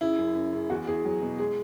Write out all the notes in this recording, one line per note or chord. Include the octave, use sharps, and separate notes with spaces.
C#3 E4
F#2
F#2
C#3
E2 F#4
E2 G#4
F#3
B2
G#3 G#4